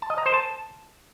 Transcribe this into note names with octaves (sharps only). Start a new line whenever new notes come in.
A5
D#5
A#5
C5
A5